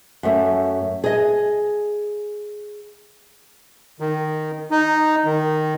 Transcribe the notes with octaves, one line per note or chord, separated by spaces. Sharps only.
F#2 A3
G#4 D#5
D#3
D#4
D#3